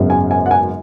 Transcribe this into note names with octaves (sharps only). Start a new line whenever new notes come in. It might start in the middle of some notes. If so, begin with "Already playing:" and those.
Already playing: G#1 F#2 C#3 G#3 B3
G#5
G#5
F#5
G#5